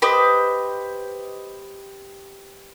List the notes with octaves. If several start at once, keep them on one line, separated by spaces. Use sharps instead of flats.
G4 B4 C5 D#5